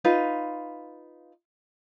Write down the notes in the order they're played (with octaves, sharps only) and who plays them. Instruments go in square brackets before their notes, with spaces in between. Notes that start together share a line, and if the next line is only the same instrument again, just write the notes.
[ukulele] D#4 F4 B4